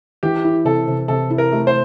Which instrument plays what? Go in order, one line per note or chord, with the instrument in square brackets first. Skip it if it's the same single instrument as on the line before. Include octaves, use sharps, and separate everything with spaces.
[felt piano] E3 [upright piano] G4
[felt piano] E4
[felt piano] C3 [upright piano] A4
[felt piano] C3
[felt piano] C3 [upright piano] A4
[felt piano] E4
[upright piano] A#4
[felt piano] A3
[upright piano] C5